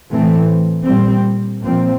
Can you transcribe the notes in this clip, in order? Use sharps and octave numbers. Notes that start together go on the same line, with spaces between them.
A2 E3 A3 C4
A#2 G3 C4
A#2 F3 C4